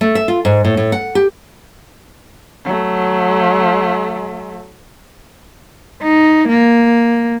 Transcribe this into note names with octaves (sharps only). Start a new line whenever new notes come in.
A3
E5
F4
G#2
A2
A2
F#5
G4
F#3 A3
D#4
A#3